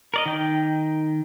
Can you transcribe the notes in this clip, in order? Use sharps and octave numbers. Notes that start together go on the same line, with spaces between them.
A#4 D5 D#5
D#3 G5